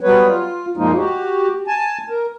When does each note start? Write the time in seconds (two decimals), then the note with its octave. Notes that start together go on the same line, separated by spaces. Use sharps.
0.01 F#3 G3 B3 B4 C#5
0.27 F4
0.77 F#2 A#2 F3 G#3 A#3 D#4
0.96 F#4 G4
1.67 G#5 A5
2.10 A#4